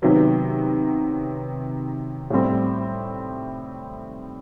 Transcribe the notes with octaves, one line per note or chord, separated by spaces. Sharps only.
C3 D#3 F#3 B3
A2 G3 C4